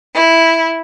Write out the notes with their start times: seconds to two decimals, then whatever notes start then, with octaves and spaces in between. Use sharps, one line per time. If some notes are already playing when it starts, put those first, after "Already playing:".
0.15 E4